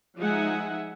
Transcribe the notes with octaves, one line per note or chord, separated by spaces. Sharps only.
F3 G#3 D#4 E5 F#5 G#5